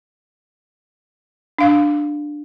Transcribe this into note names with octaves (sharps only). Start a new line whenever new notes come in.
D4 F5